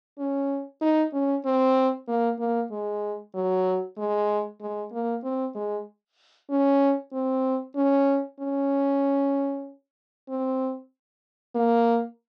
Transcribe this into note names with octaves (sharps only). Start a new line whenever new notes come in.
C#4
D#4
C#4
C4
A#3
A#3
G#3
F#3
G#3
G#3
A#3
C4
G#3
C#4
C4
C#4
C#4
C4
A#3